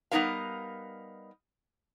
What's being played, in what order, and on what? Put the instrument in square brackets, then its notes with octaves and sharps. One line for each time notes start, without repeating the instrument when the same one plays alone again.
[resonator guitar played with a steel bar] G3 B3 C4 D#4 A#4 F5